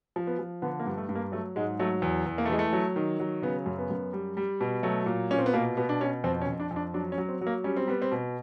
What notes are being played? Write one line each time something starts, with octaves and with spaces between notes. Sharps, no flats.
F3
B3
F3
D3 B3
A#3
G2
A3
G2
A#3
F#3 A3
G#2 G#3
F#3 A3
E2
E2
A#3
A3
E3 G#3
A3
F#3
D#3
F#3
C#3 B3
F#2
B3
F#2
G3
G3
B2
F#3 A3
A#2
A#2 C#4
C4
B3
B2 A#3
B2 B3
D4
B2 C#4
F2 C4
C#4
F2
D4
F2
D4
F#3 D4
C#4
F#3
C4
F#3
A#3
G3 C#4
C4
G3 B3
C4
B2